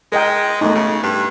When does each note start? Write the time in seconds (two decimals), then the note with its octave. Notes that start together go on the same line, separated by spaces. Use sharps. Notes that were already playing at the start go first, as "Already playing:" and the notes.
0.12 G#3 A#4 D#5 G5
0.61 F#2 A3 B3 D#4
0.75 C#3
1.04 G2